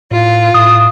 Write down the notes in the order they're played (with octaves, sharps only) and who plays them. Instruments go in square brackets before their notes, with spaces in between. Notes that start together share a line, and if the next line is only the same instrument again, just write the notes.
[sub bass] A2 [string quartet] F4
[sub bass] A2 [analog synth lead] D#6